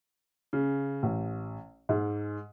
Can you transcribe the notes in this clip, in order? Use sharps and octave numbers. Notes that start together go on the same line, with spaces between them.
C#3
A1
G#2